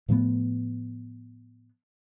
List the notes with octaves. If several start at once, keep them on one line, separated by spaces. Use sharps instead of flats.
A2 F3 A3 B3